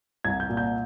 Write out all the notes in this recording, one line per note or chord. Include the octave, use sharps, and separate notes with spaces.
C2 G#6
G6
A#2
G6